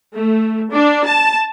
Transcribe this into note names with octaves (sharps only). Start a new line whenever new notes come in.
A3
D4
A5